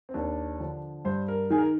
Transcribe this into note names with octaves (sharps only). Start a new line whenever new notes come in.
C4
D#2 D4
D3 F3
G2 C5
A#4
D#3 G#4
A#4